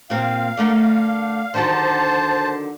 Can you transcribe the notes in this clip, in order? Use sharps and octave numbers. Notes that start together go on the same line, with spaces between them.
A#2 C4 F5
D3 A3 A#4
D3 D#3 F#3 C5 A5